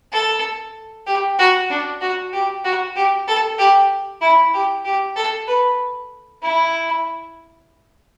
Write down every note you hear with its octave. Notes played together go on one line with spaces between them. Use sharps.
A4
G4
F#4
D4
F#4
G4
F#4
G4
A4
G4
E4
G4
G4
A4
B4
E4